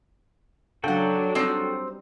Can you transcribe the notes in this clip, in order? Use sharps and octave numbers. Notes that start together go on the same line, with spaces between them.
C#3 F#3 D4 F#4 A4 F#5 G5
G3 C4 D#4